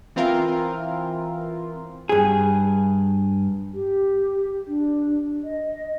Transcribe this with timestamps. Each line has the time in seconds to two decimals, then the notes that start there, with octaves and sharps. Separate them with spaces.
0.16 E3 C4 E4 F4 A#4
2.09 G2 G#4
3.74 G4
4.67 D4
5.44 D#5